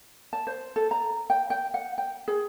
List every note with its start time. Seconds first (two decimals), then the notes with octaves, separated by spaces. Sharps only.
0.33 A5
0.47 C5
0.76 A4
0.91 A#5
1.30 G5
1.50 G5
1.74 F#5
1.98 G5
2.28 G#4